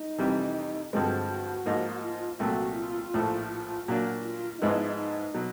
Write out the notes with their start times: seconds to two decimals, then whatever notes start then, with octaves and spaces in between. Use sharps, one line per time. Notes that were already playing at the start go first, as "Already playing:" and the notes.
Already playing: D#4
0.18 F2 C3 E3 G3
0.92 G2 D3 F3 G#3 C4 F#4
1.30 F#4
1.66 G#2 F3 A#3 D#4
2.03 F4
2.39 C2 A#2 F#3 A3 F#4
2.77 F4
3.14 A#1 A2 F3 A3
3.51 F4
3.87 A#2 F#3 A#3 D4 F#4
4.24 F4
4.61 G#2 F3 G#3 B3 D#4 E4
4.98 D#4
5.34 B2 F#3